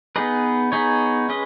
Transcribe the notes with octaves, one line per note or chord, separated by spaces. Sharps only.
B3 D#4 G#4 B4 D#5
B3 D#4 G#4 C#5
G#3 C#4 B4 D#5